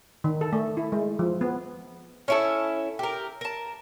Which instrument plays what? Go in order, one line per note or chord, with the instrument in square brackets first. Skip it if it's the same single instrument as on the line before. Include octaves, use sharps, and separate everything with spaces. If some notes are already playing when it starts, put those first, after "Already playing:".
[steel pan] D#3
A4
A3
E4
G#3
F3
B3
[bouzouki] C#4 E4 A4
G4 A#4
A#4 A5